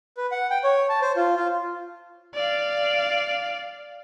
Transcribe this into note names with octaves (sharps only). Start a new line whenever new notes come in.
B4
F#5
G5
C#5
A5
C5
F4
F4
D5 F5